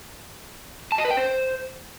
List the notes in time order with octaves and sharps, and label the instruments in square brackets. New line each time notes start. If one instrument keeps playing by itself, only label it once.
[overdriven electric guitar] A5
D#5
B4
G5
C5